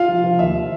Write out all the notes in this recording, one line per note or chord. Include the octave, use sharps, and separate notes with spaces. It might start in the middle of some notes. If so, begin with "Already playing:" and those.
Already playing: F4 F5
F3
F3
D#2 E5